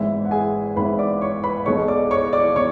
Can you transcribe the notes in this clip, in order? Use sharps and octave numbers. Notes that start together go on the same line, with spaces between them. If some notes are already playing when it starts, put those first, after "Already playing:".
Already playing: G#1 G#2 E3 B3 E4 E5
F#5
G#4 G#5
G#1 G#2 E3 B3 B4 B5
D5 D6
C#5 C#6
B4 B5
B1 B2 G#3 C#5 C#6
D5 D6
C#5 C#6
D5 D6
B2 C#5 C#6